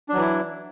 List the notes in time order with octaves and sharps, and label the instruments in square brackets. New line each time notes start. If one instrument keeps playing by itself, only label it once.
[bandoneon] D4
F#3
E3
E4